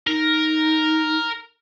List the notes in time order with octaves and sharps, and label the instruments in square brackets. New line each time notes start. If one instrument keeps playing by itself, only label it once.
[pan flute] D#4 [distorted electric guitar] A#4